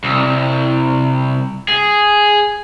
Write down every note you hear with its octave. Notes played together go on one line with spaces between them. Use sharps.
C2
G#4